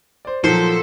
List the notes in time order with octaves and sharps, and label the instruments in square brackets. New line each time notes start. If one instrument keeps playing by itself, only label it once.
[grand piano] C5 D5
[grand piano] A#2 F#3 [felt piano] F3 [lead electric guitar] A4 [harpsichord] C5